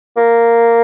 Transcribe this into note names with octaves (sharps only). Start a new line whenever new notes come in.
A#3